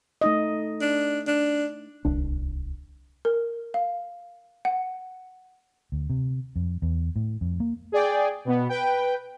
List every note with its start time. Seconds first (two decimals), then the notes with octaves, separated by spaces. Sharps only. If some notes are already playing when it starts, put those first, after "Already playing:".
0.21 A3 D#4 D#5
0.81 D4
1.27 D4
2.05 D1 C2 D4
3.25 A#4
3.74 F5
4.65 F#5
5.92 D2
6.10 C3
6.56 F2
6.82 E2
7.16 A2
7.41 F2
7.60 A#3
7.92 G#4 D5 G5
8.45 B2 B3
8.69 B4 G5